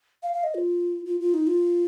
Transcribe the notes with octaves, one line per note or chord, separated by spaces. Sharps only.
F5
F5
D#5
F4
F4
F4
D#4
F4